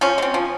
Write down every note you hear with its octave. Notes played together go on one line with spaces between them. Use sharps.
F3 C#4
G#3
C4
F3